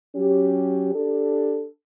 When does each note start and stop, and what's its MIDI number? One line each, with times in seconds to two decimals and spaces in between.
0.15 0.91 54
0.15 0.91 61
0.15 0.91 67
0.93 1.66 62
0.93 1.66 67
0.93 1.66 69